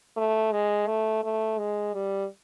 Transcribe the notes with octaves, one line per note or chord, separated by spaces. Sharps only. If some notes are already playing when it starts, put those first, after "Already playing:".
A3
G#3
A3
A3
G#3
G3